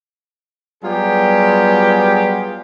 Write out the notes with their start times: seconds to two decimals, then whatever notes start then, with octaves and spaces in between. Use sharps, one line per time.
0.83 F#3 G3 B3 F4 G4 G#4